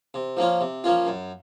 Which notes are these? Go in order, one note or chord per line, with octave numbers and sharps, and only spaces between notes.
C3
F3 A#3 C#4 F4
C3
F3 A#3 C#4 F4
F#2